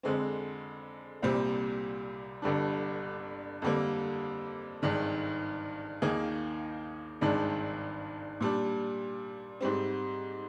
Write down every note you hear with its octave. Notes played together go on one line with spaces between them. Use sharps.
F2 D3 G#3 C4
C2 A#2 G3 C4
G1 G2 D3 G3 D4
F2 D3 G3 A#3
G#1 G2 D#3 G#3
D#2 D#3 A#3 D#4 G#4
G#1 G2 D#3 G#3 D4
A#2 G3 D4
G#2 G3 C4